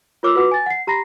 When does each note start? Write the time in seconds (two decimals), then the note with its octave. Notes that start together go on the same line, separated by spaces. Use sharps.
0.23 F4 A#4 C#5 D6 E6 F6
0.35 F#4 B4 F#5 D6
0.51 G#5 A6
0.66 F#5 C7
0.87 G4 A#5 B5 A#6 C7